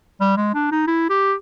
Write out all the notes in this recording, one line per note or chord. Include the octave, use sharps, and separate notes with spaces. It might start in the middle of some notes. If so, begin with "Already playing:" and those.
G3
G#3
D4
D#4
E4
G4